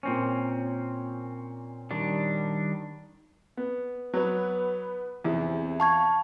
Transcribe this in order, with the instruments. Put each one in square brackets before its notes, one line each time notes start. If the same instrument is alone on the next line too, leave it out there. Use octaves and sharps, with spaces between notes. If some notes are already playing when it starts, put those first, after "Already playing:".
[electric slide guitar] A#2 C4 C#4
[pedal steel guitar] D#3 G3 D4
[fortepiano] B3
[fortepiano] F#3 [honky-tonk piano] B3 B4
[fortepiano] E2 [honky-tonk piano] C3 E4 G#4
[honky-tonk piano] F5 [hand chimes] A5 C#6 G#6